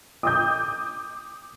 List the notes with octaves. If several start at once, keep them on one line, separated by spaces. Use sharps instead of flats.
D6 D#6 G6